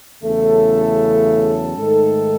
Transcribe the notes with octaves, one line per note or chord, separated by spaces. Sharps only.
E2 C#3 F#3 A3 C#4 E4 A4
G#2 D#3 A3